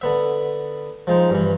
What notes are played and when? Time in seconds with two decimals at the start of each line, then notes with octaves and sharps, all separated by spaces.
0.01 D3 B3 E5
1.07 F3 G#3 D#4
1.30 G2 E3